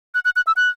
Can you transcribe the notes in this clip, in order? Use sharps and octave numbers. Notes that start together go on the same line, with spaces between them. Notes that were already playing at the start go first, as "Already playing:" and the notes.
F#6
F#6
F#6
E6
F#6